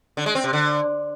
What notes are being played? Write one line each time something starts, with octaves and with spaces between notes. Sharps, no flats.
D3
G#3
C4
C3
D3